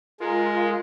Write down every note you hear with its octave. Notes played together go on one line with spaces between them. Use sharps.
G#3 F4 A#4